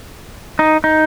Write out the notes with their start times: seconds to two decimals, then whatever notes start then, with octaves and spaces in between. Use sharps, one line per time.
0.59 D#4
0.84 D#4